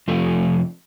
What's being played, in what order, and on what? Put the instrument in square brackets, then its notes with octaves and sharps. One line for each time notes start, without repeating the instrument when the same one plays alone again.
[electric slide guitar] F2 C3 F3 A3